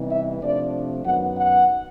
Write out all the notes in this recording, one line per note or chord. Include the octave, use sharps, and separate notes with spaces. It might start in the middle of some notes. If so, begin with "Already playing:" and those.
Already playing: C3 E3 G3 B3 D#4
E5
C3 F3 A3 D4 D5
F#2 D#3 F#3 B3 D#4 F#5
F#5